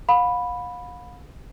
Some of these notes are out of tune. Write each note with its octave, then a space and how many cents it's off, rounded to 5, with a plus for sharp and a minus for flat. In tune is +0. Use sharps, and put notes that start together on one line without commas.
F5 +40 B5 +0